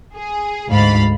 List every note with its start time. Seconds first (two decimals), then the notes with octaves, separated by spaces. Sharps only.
0.16 G#4
0.69 D2 G#2 F5 B5 A6